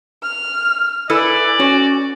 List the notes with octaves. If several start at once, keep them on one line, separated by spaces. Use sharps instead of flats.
F6
E4 A4 B4 D5 G#5
C#4 F#4